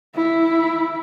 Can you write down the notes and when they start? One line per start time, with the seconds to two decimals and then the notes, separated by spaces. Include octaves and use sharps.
0.16 E4